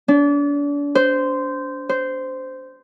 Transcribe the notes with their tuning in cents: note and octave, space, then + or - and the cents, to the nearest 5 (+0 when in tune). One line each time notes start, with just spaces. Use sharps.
D4 -35
C5 -15
C5 -15